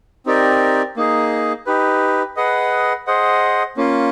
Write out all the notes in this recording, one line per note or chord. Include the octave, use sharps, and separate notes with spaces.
C4 D#4 G4 A#4 D5
A#3 D#4 G#4
D#4 G4 B4
G#4 B4 D#5 F#5
G#4 C5 D#5 F#5
A#3 C#4 F4